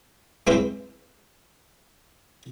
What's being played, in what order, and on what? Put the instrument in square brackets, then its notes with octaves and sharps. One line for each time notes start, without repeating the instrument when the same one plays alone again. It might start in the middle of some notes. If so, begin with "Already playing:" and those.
[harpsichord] G#3 C4 C#4 E4 B4 C5